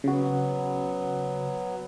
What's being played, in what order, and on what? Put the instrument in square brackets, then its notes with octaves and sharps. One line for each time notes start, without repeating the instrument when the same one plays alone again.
[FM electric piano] C#3 F#4 [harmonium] F#3 B3